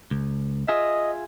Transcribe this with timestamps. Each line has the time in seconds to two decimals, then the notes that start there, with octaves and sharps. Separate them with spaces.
0.11 C#2
0.68 F4 G#4 D#5 E5